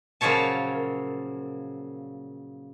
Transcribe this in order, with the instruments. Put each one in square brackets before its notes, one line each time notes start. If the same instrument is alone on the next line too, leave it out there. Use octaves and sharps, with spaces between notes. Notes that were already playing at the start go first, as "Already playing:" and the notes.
[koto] A#2 C#3 F3 F#3 C#5 A5